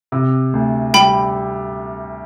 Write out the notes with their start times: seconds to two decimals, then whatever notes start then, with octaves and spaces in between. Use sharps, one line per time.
0.12 C3
0.53 D2
0.94 G3 G5 B5